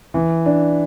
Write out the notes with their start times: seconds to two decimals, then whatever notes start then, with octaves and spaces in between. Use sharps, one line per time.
0.14 E3
0.46 D4